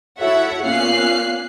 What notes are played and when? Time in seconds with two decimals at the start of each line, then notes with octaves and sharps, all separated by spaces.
0.19 E4 F#4 A4 C#5 E5 F#5
0.62 A#2 B3 C#4 F5 F#6 C7